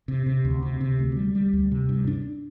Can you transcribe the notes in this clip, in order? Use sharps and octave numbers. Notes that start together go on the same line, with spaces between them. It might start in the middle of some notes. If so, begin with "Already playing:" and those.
C3
C3
D2
C3
C3
D2
G3
G3
D2
C3
G2
D4